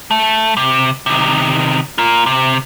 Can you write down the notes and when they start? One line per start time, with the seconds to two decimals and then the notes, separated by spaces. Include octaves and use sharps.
0.11 A3
0.57 C3
1.06 C3 D#3
1.98 A#3 F4
2.26 C3